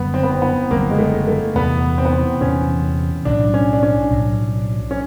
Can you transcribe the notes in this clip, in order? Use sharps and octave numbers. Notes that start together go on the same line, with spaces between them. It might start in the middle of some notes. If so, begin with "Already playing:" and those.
Already playing: F#1 F#2 D3 G3 B3
C4
B3
C4
B3
F#1 F#2 D3 G3 A#3
G#3
A3
A3
E2 C3 E3 B3
C4
B3
C4
E2 C3 E3 C#4
B1 A2 F#3 D4
C#4
D4
C#4
B1 A2 F#3
C#4